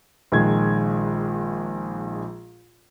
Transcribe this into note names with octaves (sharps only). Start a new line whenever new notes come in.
A#1 D#3 G#3 G#6